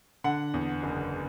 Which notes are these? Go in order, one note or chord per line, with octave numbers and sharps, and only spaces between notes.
D3 F#5
E2
F#1